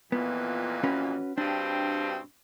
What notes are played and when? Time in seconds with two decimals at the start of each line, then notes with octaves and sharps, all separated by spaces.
0.12 F2 A#2 E3 B3
0.83 C#4 F#4 B4
1.38 G2 B2 C4 D4